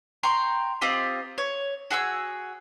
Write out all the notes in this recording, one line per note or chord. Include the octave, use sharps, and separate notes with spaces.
G5 A#5 C6 C#6
C4 F4 G4 D#5
C#5
F#4 G#4 C6 E6